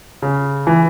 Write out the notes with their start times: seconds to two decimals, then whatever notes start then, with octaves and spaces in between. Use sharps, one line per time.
0.22 C#3
0.67 E3